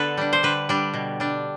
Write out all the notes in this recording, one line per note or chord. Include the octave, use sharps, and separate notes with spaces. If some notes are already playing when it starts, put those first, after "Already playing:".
Already playing: D3 B3 A4 B4
G3 D4
C5
D3 B4
G3 D4
B2
G3 D4